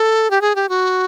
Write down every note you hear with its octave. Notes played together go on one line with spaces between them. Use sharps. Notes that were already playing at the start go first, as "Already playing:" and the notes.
Already playing: A4
G4
G#4
G4
F#4